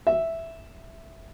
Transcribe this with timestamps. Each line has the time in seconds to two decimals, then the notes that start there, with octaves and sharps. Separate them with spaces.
0.07 E5